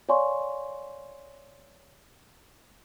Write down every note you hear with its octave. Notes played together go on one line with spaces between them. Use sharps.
C#5 D5 F5 G#5 C6 C#6